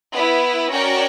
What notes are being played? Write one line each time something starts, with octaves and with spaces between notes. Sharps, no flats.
B3 E4 B4
C#4 F#4 A#4 D5 G5